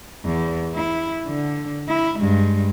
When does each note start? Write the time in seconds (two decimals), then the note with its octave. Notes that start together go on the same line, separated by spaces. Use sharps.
0.25 E2
0.75 E4
1.27 D3
1.88 E4
2.19 G2 G#3